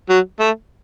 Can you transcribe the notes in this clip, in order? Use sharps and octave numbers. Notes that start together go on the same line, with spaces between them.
F#3
A3